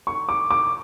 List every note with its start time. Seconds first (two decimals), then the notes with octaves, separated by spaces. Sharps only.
0.07 C#6
0.29 D6
0.51 D6